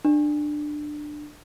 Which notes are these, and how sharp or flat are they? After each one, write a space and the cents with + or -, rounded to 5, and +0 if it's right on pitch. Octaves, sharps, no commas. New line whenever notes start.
D4 +20